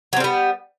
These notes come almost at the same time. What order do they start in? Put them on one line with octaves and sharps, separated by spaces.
F#3 C4 G3 B3